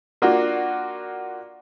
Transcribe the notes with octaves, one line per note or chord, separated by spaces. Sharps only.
A#3 D4 F4 F#4